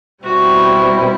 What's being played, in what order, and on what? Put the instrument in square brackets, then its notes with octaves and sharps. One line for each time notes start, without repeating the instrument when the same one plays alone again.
[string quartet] B2 G3 C4 E4 [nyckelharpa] F#4